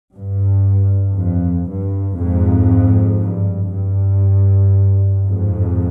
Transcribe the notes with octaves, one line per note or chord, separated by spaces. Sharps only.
G2
F2
G2
F2 G#2
G2
G2
F2 G#2